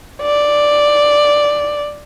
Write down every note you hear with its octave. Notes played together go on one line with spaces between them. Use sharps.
D5